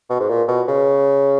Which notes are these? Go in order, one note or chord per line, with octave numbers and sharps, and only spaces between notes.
B2
G#2
A#2
B2
C#3